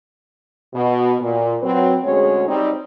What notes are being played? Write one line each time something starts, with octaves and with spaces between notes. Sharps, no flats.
B2
A#2
F#3 C4 B4
D2 G#3 C#4 F#4 G#4 C#5
G3 C4 D#4